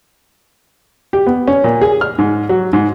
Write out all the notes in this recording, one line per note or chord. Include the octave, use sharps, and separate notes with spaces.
G4
B3
C#4
A#2
G#4
F6
G#2
F#3
G#2